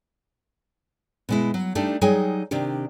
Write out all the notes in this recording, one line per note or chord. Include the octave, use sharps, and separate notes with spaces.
B2 G#3 E4
F#3
G3 A3 D4 D#4 G4 D5
F#3 G3 D#4 G#4 G5 G#5
C3 D#3 D4 G4